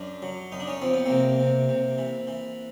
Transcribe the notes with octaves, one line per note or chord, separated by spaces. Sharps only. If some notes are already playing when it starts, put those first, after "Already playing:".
Already playing: F#2 D4
F#3
F#2 D#4
D4
C#4 D#4
F3 C4
B3
C3 A#3 C4
C3
C3
E3
E3